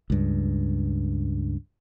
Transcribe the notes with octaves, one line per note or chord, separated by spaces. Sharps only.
C#2 G2